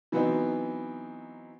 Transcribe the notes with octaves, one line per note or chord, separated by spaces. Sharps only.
E3 F#3 B3 C4 D#4